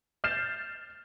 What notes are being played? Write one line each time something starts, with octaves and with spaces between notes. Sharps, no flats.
F6 G6 A6 C7 E7